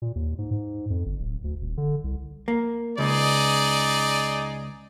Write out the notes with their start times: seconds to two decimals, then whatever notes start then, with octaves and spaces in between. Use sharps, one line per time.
0.02 A#2
0.15 D#2
0.38 G#2
0.51 G#2
0.90 F2
1.06 G1
1.20 D1
1.44 D2
1.61 D#1
1.77 D3
2.04 C2
2.48 A#3
2.98 C#2 D#4 G#4 D5